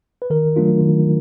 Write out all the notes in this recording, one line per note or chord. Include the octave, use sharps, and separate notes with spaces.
B4
D#3 A#4
F#3 A3 D4 F4
D#3